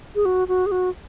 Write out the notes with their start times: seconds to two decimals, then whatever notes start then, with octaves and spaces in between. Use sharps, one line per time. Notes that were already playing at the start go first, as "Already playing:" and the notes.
0.15 G#4
0.25 F#4
0.48 F#4
0.66 G#4
0.72 F#4